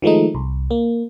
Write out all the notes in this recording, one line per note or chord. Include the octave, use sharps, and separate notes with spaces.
D#3 F3 G#3 A3 D#4
C2
A#3